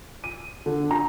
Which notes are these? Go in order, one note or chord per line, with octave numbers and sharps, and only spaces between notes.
D#7
D3
A#5